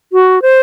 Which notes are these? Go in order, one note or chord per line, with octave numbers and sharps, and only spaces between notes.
F#4
C5